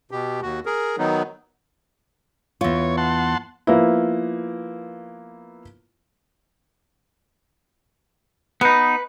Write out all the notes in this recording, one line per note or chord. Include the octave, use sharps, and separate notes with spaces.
B2 G4
D#2 F#4
G#4 A#4
D#3 F#3 B3 D#4
E2 F4 C#5
F#5 A5 C6
F3 A#3 B3 E4
B3 D#4 B4